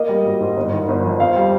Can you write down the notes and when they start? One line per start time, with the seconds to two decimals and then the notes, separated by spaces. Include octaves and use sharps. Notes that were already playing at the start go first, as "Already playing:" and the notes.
Already playing: A#3 D#5
0.09 G3
0.25 G#1
0.41 G#2
0.57 G1
0.72 D#3
0.88 G1
1.04 F2
1.20 C4 F5
1.37 G3